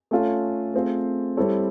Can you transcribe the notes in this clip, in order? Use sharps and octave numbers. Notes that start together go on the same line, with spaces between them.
A3 C#4 F4 A4
A3 C4 F4 G#4 C5
G3 C4 E4 A4 C#5